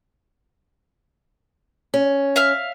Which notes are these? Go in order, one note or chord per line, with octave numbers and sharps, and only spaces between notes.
C#4
E5 F5 F6